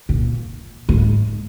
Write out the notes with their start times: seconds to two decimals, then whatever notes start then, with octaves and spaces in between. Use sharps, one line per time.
0.09 A#2
0.89 G#2